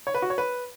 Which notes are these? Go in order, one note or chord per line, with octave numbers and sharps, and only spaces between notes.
C#5
B4
F#4
C#5
B4